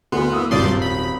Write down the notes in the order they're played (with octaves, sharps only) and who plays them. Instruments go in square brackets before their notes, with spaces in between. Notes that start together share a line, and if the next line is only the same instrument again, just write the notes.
[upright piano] D2 [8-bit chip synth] B3 [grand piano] C6
[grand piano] A#3 [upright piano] D#6 E6
[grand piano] D#1 D#6 [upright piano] G#1 [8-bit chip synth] G2 D5 C6
[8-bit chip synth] B5